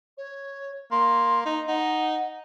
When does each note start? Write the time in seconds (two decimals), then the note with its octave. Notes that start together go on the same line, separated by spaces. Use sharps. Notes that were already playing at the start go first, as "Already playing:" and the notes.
0.17 C#5
0.91 A#3 C6
1.46 D#4
1.68 D#4 F#5